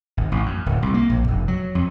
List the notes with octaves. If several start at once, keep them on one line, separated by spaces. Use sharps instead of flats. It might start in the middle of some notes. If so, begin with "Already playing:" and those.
G#1
A1
F#2
D1
C2
A#3
A#1
F1
F#3
F2